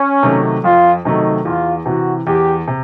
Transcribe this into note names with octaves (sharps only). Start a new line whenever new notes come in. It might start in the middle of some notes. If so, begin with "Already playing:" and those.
Already playing: C#4
C3 D#3 F#3 A3
F2 F4
C3 D#3 F#3 A3 D#4
E2 F4
C3 E3 F#4
E2 G4
C3